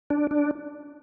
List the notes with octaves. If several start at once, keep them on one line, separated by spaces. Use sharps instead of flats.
D4
D4